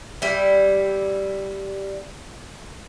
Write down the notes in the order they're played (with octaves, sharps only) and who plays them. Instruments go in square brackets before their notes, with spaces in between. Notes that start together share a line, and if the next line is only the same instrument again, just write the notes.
[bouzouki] G3 E4